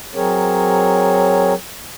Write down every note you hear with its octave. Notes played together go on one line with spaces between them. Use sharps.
F#3 C4 G#4 A#4 C#5